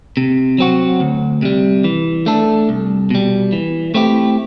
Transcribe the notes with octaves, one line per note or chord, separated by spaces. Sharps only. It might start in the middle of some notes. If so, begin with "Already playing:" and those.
C3
F#3 C4 F#4
D2
C3 G3
E3
A3 D4 A4
C2
B2 G3
E3
A3 C4 E4 G4